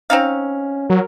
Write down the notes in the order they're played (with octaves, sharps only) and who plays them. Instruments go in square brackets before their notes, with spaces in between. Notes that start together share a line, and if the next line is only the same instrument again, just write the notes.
[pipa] C4 D#4 F5 [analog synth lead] C#4
[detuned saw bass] F#3 [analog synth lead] A#4